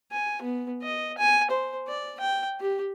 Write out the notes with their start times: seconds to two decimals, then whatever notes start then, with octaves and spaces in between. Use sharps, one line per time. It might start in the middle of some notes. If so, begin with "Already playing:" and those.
0.12 G#5
0.42 B3
0.83 D#5
1.18 G#5
1.51 C5
1.88 D5
2.20 G5
2.60 G4